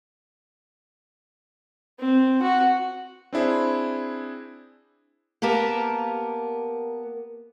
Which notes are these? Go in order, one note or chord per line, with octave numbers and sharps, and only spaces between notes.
C4
F#4
C4 D4 E4 G#4 C5
A#3 B3 G4 A#4 A5